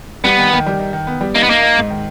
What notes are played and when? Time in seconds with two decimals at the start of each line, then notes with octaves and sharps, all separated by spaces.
0.24 G3 B3
0.39 D#3
0.53 D#3
0.66 G3
0.79 D#3
0.93 D#3
1.07 B3
1.21 G3
1.35 A#3 D#4
1.43 B3
1.49 A#3 D#4
1.63 D#4
1.77 G#2
1.90 D#3